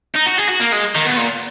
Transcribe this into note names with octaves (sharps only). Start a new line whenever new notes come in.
D#4
F#4
G#4
F#4
A#3
G#3
D#3
B2
A#2